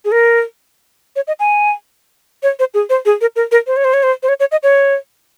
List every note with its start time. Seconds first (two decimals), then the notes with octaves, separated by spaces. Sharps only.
0.05 G#4
0.12 A#4
1.16 C#5
1.27 D#5
1.40 G#5
2.43 C#5
2.59 C5
2.74 G#4
2.90 C5
3.06 G#4
3.21 A#4
3.36 A#4
3.52 A#4
3.67 C5
3.77 C#5
3.84 C5
3.94 C#5
4.03 C5
4.23 C5
4.29 C#5
4.40 C#5
4.52 D#5
4.63 C#5